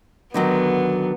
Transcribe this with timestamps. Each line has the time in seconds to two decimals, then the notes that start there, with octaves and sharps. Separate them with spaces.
0.34 D3 D#3 F#3 B3